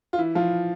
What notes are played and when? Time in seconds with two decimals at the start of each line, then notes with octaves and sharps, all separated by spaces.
0.13 F4
0.18 E3 E4
0.35 F3 F4